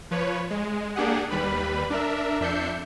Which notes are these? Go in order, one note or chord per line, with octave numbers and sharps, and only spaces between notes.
F3 B4 C#5
G#3
A#3 D4 G4 G#4 F#5
D#2 G3 B4 B5
D4 A#4 E5
F2 D4 E5 G6 C7 C#7